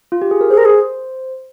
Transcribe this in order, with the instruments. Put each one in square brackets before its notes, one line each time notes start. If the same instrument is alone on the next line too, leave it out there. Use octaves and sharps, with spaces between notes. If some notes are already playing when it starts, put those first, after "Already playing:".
[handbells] F4
G4
G#4
A#4
[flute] G#4 [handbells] C5
[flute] A#4
G#4